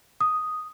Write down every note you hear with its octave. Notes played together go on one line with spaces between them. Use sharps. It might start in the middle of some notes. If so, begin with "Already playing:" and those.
D#6